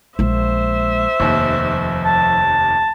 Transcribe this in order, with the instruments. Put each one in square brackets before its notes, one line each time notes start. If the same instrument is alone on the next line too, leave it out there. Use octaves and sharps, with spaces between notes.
[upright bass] A#1 G#3 [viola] C5 E5
[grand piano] F1 D#2 [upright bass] F3
[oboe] A5